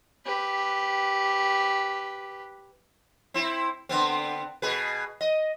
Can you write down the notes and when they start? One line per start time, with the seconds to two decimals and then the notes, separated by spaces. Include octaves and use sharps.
0.25 G4 B4
3.34 C4 E4
3.89 D3 B3 C4
4.62 B2 G#4 B4
5.21 D#5